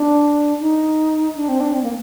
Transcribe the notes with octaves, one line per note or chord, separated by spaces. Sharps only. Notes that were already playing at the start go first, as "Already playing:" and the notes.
Already playing: D4
D#4
D4
C4
D4
C4
A#3